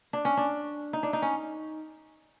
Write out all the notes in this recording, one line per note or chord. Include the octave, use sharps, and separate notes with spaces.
D4
C#4
D4
D#4
D4
D#4
C#4